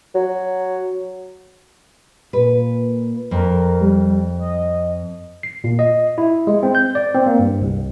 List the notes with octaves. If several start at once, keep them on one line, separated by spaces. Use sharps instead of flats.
F#3
A#2 B4
F2 A#4
G3
D#5
C7
A#2
D#5
E4
G#3
C4
G6
D5
C4
A#3
G2
C2